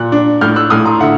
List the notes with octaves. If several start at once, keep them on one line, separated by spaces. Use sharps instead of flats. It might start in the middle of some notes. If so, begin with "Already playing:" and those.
Already playing: A#2 F#6
D4
A2 F6 G6
E6 F#6
A2 D#6 F6
A#5 C6
D3 E5 F#5